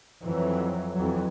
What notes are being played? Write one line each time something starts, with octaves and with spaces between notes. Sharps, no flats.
F2 E3 F#3
F2 E3 F#3